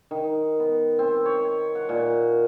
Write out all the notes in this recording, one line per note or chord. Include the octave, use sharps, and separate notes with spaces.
D#3
B3
C4
C#5
F#5
A#2